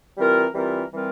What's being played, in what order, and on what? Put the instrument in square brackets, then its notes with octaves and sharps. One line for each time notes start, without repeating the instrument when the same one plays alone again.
[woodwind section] E3 G3 C4 F4 A#4
E3 G3 C4 F4 A#4
E3 G3 C4 F4 A#4